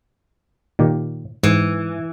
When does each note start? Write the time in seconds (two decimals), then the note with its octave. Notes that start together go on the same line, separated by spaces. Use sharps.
0.79 A#2 D#3 G4
1.43 G#2 E3